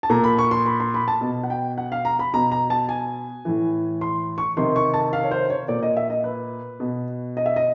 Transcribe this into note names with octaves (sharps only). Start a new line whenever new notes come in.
A5
A#2 A#5
B5
C#6
C6
B5
C6
B5
A5
B2
F#5
G5
F#5
F5
A#5
B5
B2 A#5
A#5
A5
G#5
A2 E3
C6
C#6
C3 D#3 C6
C#6
A5
F5
C#5
C5
C#5
A#2 D5
D#5
E5
D#5
B4
B2
D#5
E5
D#5